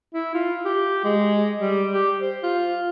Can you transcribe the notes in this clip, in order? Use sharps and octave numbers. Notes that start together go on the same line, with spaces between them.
E4
F4
G4
G#3
G3
G4
C5
F4